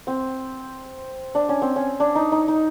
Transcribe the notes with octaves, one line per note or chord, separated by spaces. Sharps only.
C4
D4
C#4
C4
C#4
D4
D#4
D#4
D#4